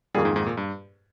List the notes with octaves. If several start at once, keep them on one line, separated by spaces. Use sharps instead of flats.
F2 D#3 G3 A#3 F4 G#4
G#2
G#2
A#2
G2